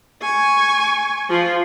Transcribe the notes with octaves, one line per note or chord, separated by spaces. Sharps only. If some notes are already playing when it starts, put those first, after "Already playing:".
G#5 C#6
F3 F4